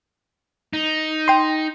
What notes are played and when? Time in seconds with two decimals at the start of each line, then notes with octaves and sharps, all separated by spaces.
0.73 D#4
1.28 G5 C6